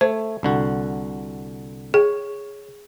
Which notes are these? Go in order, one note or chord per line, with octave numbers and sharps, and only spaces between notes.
A3 C5
C2 D3 F#4
G#4 C#5